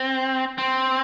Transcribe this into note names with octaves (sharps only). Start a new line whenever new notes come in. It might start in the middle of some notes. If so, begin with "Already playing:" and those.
Already playing: C4
C4